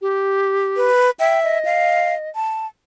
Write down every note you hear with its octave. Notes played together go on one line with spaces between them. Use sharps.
G4
B4
E5 G5
D#5
F5
A5